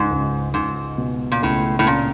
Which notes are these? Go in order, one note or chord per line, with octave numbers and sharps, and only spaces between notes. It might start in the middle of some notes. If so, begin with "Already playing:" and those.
Already playing: C#2 G#2
C#2
C#2 G#2
B2
A#2
C#2 A2
A2
A#2 C#4